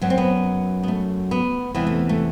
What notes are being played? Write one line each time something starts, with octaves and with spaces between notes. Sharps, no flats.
F#2 F#3 B3
C4
B3
B3
A3
B3
E2 C3 E3 G3 B3
A3
A3